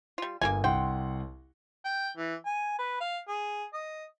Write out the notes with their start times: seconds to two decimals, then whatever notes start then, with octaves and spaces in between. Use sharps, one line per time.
0.18 G3 F4
0.41 G1 A#3 F4 G#5
0.64 C2 F#5 G5 C6
1.85 G5
2.17 E3
2.46 G#5
2.79 B4
3.01 F5
3.28 G#4
3.74 D#5